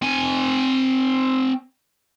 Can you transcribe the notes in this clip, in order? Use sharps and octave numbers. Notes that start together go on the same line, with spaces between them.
C4 G#5